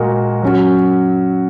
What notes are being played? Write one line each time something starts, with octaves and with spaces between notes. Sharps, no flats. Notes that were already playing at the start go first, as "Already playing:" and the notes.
Already playing: A#2 G#3 F#4 A#4
F#3 C#4 F#4